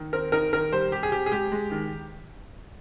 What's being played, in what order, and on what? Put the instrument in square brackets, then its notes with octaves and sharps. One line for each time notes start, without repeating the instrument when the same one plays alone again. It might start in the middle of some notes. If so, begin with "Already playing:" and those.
Already playing: [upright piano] D#3
C4 A#4
D#4 A#4
D#3 A#4
G3 C5
C3 G4
G#4
C3 G4
G#4
G#3 G4
G#3
D#3